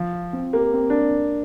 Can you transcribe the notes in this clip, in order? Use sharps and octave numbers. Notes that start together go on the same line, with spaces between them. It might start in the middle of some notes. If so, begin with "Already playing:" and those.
Already playing: F3
F4
C4
A#3 G4
C4
D4